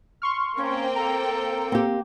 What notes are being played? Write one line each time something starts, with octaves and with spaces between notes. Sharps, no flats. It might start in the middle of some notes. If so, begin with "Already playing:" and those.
C6 C#6 F6
A#3 C4 C#4 G5
A4 A#5
A#3 C4 G4